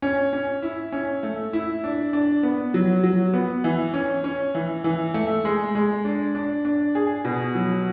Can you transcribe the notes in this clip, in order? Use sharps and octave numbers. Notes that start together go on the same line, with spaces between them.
C#4
C#4
E4
C#4
A3
E4
D4
D4
B3
F#3
F#3
B3
E3
C#4
C#4
E3
E3
A3
G#3
G#3
D4
D4
D4
G#4
B2
F#3